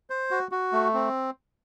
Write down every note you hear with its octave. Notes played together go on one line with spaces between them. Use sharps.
C5
F#4
F#4
A3
C4